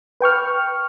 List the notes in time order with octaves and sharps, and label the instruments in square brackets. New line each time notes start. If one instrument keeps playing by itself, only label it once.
[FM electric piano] B4 G5 C#6 F6